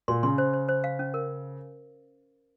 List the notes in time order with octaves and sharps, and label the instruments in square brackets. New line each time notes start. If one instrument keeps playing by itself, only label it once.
[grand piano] A#2 [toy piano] C6
[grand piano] C#3 [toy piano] C6
[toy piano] C5
C5
C5
F5
C#4
A#4